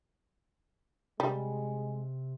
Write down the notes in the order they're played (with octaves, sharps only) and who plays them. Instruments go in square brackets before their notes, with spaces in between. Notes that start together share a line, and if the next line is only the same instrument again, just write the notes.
[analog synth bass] C3 [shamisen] G3 [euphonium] G#3